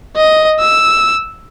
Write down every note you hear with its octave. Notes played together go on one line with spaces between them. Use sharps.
D#5
E6